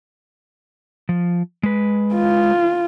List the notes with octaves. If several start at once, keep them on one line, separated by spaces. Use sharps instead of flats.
F3
G#3 B4
F4